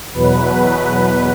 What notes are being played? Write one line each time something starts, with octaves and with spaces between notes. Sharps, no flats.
E2 B2 F#3 B4
B4